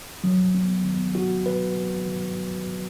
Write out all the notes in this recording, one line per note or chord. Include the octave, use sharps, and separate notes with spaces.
F#3
B3
B3
F#4
B4